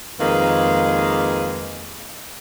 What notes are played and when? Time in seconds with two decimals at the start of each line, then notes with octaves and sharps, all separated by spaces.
0.20 F2 D#3 G#3 A#3 B4 F5